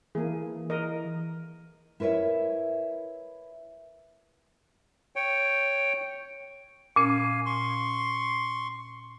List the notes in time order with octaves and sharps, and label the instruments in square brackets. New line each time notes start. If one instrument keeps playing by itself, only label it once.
[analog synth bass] E3 [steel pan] A#3 G#4
[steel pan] A#4 D#5
[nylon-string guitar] E4 A#4 B4 C#5 E5
[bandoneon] C#5 G5
[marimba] A#2 C#4 [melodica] F5 G#5
[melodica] C6 C#6